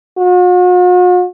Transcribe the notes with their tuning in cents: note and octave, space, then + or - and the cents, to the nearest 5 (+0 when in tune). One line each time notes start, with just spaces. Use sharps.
F#4 -45